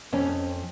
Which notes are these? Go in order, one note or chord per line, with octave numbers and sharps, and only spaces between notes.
F2 C#4